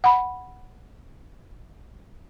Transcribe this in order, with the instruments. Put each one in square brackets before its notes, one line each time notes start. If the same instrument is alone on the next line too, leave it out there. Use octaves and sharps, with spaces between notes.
[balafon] F#5 B5